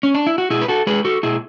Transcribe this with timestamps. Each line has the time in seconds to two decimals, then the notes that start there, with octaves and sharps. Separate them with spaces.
0.03 C#4
0.15 D4
0.27 E4
0.38 F#4
0.50 B2 E4 G#4
0.62 B4
0.68 F#4 A4
0.87 G#3 G#4 B4
1.05 F#4 A4
1.23 B2 E4 G#4